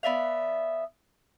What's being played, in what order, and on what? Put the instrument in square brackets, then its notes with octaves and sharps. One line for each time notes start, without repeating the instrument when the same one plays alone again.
[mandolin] B3 D5 E5 F5